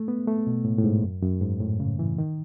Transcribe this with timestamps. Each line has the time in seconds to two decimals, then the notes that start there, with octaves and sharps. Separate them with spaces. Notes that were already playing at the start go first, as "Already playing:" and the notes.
Already playing: A3
0.08 B3
0.28 A3
0.47 B2
0.65 A2
0.78 A2
0.84 G#2
1.03 F#2
1.22 F#2
1.41 G#2
1.60 A2
1.80 C#3
1.99 E3
2.18 D#3